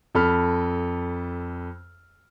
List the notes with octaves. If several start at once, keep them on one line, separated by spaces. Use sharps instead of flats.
F2 A4 B5 F6